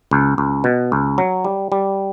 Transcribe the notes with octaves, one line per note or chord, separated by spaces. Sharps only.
C#2
C#2
B2
C#2
F#3
G3
G3